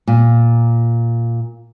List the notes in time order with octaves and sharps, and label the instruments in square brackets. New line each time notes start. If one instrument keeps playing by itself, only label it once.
[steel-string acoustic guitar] A#2